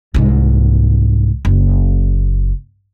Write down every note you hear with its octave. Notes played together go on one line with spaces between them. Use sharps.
C2 G#2
F#1